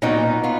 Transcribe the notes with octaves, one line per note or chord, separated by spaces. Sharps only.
A#2 F#3 B3 D#4
B3 F4